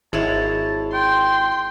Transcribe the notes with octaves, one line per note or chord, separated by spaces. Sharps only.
G#1 G#3 E4 C#5 A5
G5 C6